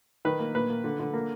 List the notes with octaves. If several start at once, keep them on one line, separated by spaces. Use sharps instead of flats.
D#3 B4
A#3
A#2 B4
A#3
D3
D3
A#3